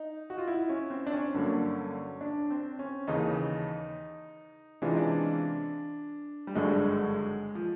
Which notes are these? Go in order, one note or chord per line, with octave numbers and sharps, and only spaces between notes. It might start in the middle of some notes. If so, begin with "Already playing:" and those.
Already playing: D#4
F#4
F4
E4
C#4
C4
D4
C#4
G2 D3 F#3 A#3
D4
C4
C#4
D#2 C#3 E3 D#4
C3 E3 G#3 C#4 D4 F4
D#4
D4
G3
G#1 G2 D3 F#3 G#3
F3